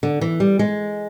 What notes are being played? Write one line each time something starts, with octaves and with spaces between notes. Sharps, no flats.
D3
E3
G3
G#3